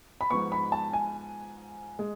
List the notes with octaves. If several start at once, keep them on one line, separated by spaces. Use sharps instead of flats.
B5
G#2 F3 B3 C#6
B5
A5
G#5
G#3